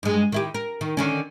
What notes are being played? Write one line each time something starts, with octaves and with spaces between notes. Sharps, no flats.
G2 G#3
D#3 E4 G4
A#4
D#3
D3 D#3 C#4